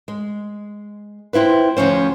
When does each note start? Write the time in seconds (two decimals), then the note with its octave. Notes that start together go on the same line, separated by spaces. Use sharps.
0.08 G#3
1.33 C4 E4 F4 B4
1.77 D2 C3 F3 C#4 C5